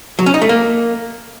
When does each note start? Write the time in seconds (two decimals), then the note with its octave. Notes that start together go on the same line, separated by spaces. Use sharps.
0.19 F#3
0.26 C#4
0.34 D#4
0.42 A3
0.49 A#3